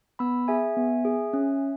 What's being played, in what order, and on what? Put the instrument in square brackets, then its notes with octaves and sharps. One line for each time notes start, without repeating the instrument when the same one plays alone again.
[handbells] B3 B5 E6
G#4 E5 G#5
B3
G#4
C#4